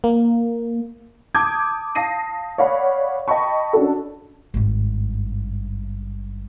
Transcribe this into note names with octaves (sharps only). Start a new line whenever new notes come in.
A#3
A5 D6 D#6 G6 G#6
F5 A5 D#6 A#6 C7 D#7
C#5 D5 F5 F#5 B5
D#5 G5 A5 B5 C#6
C#4 D4 F#4 A4
G#1 G2